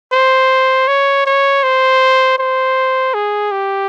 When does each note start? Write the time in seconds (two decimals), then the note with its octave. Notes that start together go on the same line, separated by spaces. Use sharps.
0.12 C5
0.88 C#5
1.26 C#5
1.63 C5
2.38 C5
3.14 G#4
3.52 G4